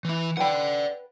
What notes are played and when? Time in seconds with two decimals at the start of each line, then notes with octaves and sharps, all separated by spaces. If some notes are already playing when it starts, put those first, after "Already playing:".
0.05 E3 E4
0.37 B4 D5 F#5 G5 B5